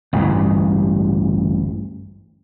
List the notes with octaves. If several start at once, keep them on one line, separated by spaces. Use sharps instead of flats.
A1 D2 G2 G#3